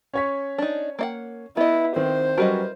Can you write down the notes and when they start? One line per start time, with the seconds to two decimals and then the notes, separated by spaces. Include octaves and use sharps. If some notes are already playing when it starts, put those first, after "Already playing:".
0.14 C#4 C#5 B6
0.58 D4 D#4
0.99 A#3 D#5 F#5
1.57 B3 E4 D#5
1.96 D#3 C4 C5
2.38 F#3 G3 C#4 A#4 B4 D#5